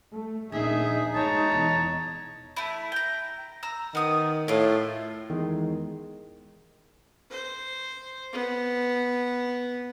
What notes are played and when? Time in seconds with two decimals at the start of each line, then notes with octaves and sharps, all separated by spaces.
0.12 A3
0.52 D#1 A#1 C4 D#4 G#4 E5
1.15 G1 G#3 C#5 A5 A#5
1.52 E1 E2
2.57 A3 E4
2.92 G5 A#5
3.63 A#5 E6
3.95 D#3 B3 D#6
4.48 A2 E4 F4
5.30 E2 D#3 G#3
7.30 C5
8.32 B3